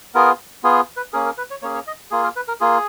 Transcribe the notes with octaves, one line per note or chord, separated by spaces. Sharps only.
B3 F4 G#4 A#4
B3 F4 G#4
B4
A#3 C#4 G#4 A#4
A#4
B4
C#5
A#3 C#4 G#4 C#5
C#5
D#5
A#3 F4 G#4
A#4
B4
A#4
A#3 F4 G#4